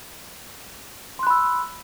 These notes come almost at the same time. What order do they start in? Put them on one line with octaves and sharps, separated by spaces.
C6 F#6 B5 E6